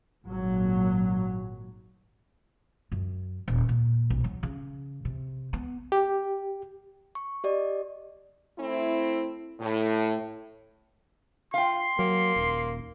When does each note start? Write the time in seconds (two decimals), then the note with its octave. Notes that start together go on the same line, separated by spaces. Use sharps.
0.25 G#1 A#2 F#3
2.92 F#2
3.48 D#1
3.69 A#2
4.10 B1
4.24 F#3
4.43 C#3
5.05 C3
5.53 B3
5.92 G4
7.15 C#6
7.44 G4 D5 D#5
8.59 A3 C4 E4
9.60 A2
11.54 F4 F5 G5 C6
11.99 F#3 A#3
12.36 D#1